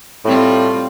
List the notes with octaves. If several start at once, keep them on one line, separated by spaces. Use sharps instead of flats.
A2 G3 C4 F4